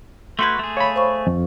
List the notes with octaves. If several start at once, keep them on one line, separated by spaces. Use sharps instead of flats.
A3 F#4 B4 C6 G6 G#6
A3 G#4
C#5 F5 B5
C5 F5 C#6
F2